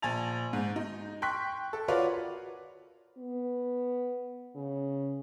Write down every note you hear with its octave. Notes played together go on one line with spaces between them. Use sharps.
A#1 G#5 A5 A6 F7
G#2
D#4
G5 C6 C#6 F#6 B6
A4
F4 F#4 A#4 B4 C#5 D5
B3
C#3